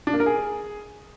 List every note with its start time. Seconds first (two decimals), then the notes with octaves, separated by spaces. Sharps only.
0.07 D4
0.13 A#3
0.20 A#4
0.26 G#4